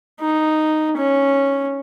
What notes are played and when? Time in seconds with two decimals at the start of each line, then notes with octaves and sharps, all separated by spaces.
0.20 D#4
0.97 C#4